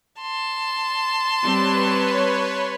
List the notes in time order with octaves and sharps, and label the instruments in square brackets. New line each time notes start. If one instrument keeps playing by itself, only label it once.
[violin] A5 C6
[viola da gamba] G3 C4 [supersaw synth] B4 C#5